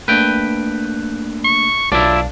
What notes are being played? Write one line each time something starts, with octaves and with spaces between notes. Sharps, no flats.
A3 A#3 D4 B4 G5
C#6
B1 D4 E4 F4 D5 F5